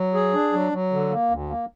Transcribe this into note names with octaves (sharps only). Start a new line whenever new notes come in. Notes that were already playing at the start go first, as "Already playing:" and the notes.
Already playing: F#3
G#4
D4
F#3
F#3
D3
A#3
D2
A#3